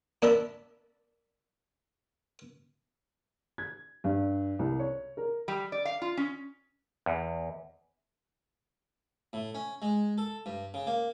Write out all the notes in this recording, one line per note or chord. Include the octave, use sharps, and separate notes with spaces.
A#3 D4 E5 A5 B5
G#6
G2
C2
C#5
A#4
G3
D5
F5
F4
C#4
E2
A2
C#4
G#3
A4
G2
C#3
A#3